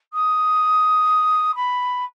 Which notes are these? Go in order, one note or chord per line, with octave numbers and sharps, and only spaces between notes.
D#6
B5